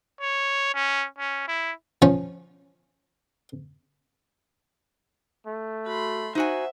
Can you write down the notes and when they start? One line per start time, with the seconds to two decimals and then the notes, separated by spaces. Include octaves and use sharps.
0.21 C#5
0.74 C#4
1.18 C#4
1.48 E4
2.02 F3 C#4 C#6
5.47 A3
5.86 F#4 B5 C6
6.35 D#4 F#4 C5 E5 F#5 G#5